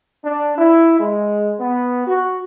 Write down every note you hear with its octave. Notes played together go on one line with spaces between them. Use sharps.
D4
E4
G#3
B3
F#4